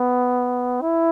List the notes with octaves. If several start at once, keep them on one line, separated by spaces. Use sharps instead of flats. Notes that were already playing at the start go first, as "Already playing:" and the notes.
Already playing: B3
E4